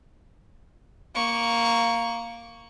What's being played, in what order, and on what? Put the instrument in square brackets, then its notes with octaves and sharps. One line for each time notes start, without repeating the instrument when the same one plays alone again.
[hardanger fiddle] A#3 C#6